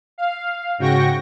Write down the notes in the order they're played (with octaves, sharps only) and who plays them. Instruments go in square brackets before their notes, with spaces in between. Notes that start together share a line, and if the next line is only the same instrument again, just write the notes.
[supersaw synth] F5
G#2 C#3 F#4 G5 C#6 A#6